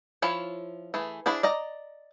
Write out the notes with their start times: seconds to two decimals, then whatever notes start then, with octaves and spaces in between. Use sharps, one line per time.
0.22 F3 E4 F4 C#5
0.94 E3 A3 G#4
1.26 D4 E4 G#4 C5
1.43 D5 D#5 A#5